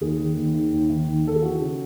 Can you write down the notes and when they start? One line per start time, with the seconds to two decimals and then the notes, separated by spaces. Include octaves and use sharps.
0.01 D#2 G#4
0.19 D#3
0.36 D#2
0.54 D#3
0.72 D#2
0.90 D#3
1.07 D#2
1.25 D#3 A4
1.35 G#4
1.42 E3 F#4
1.60 C#3